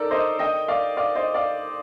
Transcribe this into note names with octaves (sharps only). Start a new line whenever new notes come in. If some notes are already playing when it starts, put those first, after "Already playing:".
Already playing: D#4 A4 A#4 D5
C5 D#5
D#5 G5
D5 F5
D5 F5
C5 D#5
D5 F5